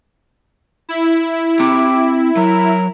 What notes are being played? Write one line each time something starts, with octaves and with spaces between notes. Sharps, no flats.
E4
C4 G4 A#5
F#3 A#4